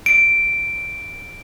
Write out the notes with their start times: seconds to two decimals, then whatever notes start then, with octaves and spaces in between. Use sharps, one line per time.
0.06 D7